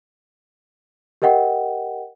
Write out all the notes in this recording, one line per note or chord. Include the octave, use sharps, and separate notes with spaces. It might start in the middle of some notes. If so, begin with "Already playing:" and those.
G4 A#4 D#5 F#5 G5